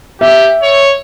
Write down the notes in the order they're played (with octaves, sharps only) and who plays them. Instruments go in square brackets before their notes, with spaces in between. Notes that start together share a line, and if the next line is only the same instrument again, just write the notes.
[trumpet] G4 [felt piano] E5
[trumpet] C#5